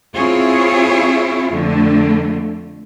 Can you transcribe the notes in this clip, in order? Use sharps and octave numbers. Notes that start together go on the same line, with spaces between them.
C4 E4 F4 G#4 C#5
F2 D3 A3